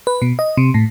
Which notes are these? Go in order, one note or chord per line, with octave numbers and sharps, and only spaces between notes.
B4
B2
D#5
C3
A2